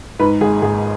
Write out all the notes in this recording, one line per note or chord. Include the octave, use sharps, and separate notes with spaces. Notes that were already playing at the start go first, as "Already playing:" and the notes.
G#2 B4
G#1 G#4
G#1 G#4